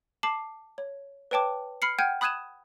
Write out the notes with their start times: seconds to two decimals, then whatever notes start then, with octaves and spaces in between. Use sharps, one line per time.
0.23 A5 D6 C7 F#7
0.78 C#5
1.31 B4 C#5 G5 A5 D6
1.82 B5 F6 C7 C#7
1.99 F#5 G5 F6 G6 G#6 D#7
2.21 B5 D#6 F#6 G#6 D#7 E7